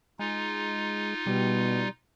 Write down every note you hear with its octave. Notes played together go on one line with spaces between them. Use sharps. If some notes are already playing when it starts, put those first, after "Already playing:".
G#3 D#4 F4
B2 G3